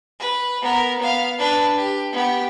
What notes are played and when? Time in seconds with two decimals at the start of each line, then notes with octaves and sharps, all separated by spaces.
0.19 B4
0.61 B3 A#4
0.99 B3 F5
1.38 D4 B4
1.77 G4
2.12 B3 G4